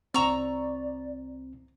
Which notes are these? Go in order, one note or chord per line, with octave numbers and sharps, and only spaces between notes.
C2 C4 D5 A#5 C#6 E6